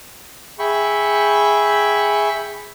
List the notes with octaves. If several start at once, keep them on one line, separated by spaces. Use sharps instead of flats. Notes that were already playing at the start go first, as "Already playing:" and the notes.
G#4 E5 G5 B5 C#6